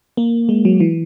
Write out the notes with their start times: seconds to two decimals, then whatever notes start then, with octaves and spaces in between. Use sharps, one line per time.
0.17 A#3
0.49 G#3
0.65 F#3
0.80 E3